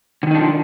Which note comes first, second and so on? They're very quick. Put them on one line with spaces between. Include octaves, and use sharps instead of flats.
D3 D#3 D#4 D4 F3